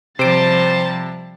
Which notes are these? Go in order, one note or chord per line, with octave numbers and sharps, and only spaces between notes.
C3 F3 G3 C5 A5 A6 D7